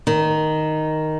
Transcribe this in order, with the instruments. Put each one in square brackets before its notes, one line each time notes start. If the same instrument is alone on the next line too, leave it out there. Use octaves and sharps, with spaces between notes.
[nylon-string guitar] D#3